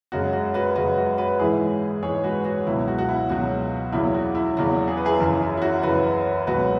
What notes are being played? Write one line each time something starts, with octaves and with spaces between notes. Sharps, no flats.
F#2 C#3 G#3 F#4
F#4
F#4 B4
F#2 C#3 G#3 F#4 B4
F#4
F#4 B4
G#2 E3 G#3 E4 G#4
G#2 E3 G#3 G#4 C#5
F#4 B4
F#4
C#2 B2 F#3 E4
F#4
F#4
E4
C#2 B2 F#3 F#4
E2 C#3 F#3 E4
F#4
E4
E2 C#3 F#3 F#4
G#4
B4
E4 G#4
F#2 C#3 E3 E4
E4
E4
F#4
F#2 C#3 E3 F#4 B4
C#2 B2 F#3 F#4 B4